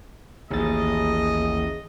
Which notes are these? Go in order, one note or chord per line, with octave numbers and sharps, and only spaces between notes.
A1 D#2 G#4 D#5 A6